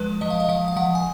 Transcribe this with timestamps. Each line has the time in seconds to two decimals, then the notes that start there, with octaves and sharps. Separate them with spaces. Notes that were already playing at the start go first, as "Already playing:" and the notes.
Already playing: F3 G#3 B4
0.21 F3 D#5
0.30 F5
0.40 D#5
0.49 F3 F5
0.68 F5
0.76 F3 F#5
0.95 G#5